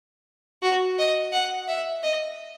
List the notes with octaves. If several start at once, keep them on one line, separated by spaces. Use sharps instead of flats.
F#4
D#5
F#5
E5
D#5